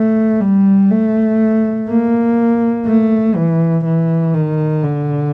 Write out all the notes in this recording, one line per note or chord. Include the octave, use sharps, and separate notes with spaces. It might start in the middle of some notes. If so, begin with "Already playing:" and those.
Already playing: A3
G3
A3
A#3
A3
E3
E3
D#3
D3